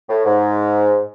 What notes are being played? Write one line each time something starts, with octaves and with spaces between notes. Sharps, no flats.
A2
G#2